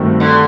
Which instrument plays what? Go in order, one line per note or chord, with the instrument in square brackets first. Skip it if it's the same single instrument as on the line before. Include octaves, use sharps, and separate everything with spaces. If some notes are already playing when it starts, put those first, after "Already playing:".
Already playing: [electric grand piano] G2 D#3 A3 C4 F#4
[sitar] D3